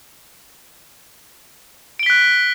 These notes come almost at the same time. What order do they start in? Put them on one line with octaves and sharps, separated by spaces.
D7 G7 B6 F#6